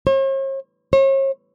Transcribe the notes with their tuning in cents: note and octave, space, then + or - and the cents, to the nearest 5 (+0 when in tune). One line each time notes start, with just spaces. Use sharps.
C#5 -45
C#5 -40